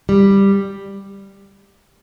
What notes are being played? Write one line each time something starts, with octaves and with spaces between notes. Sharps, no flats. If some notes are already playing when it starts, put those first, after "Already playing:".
G3